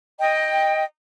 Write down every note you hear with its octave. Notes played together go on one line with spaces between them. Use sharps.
D#5 G5